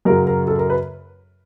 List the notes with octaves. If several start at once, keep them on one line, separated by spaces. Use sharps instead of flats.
F#2 C#3 F#3 A#4
A#4
A4
A#4
B4